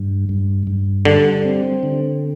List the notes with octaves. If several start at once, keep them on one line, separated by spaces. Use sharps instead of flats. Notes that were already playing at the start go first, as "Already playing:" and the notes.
Already playing: G2
G2
G2
D3 G3
C4
D3